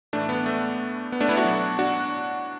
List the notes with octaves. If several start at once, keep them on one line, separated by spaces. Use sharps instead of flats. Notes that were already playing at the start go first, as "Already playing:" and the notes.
A2 E3 A3 D4
B3
A3
B3
A3 D4
B3 E4
D4 F#4
B2 F#3
D4 F#4